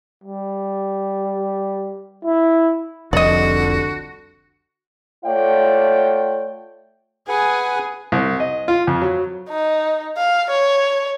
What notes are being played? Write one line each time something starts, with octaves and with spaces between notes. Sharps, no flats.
G3
E4
F1 C2 F2 D3 F#4 D5 D#5
A3 F4 C#5 D5 F#5 G5
G#4 B4 F#5 G#5
C2
D#5
F4
F2
F#3
D#4
F5
C#5